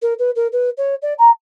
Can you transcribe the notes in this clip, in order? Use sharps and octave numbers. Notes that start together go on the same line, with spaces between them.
A#4
B4
A#4
B4
C#5
D5
A#5